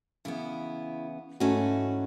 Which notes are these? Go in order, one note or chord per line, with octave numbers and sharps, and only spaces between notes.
C#3 E3 B3 E4
G#2 E3 A3 C#4 F#4